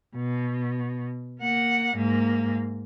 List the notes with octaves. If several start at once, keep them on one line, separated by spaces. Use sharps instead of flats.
B2
A#3 F#5
G#2 A#3